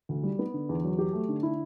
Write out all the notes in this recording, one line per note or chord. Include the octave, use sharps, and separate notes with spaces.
D2
G3
B3
D3
E2
F#3
G4
A3
D3
E4